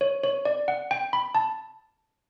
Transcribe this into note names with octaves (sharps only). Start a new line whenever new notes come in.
C#5
C#5
D5
F#5
G5
B5
A5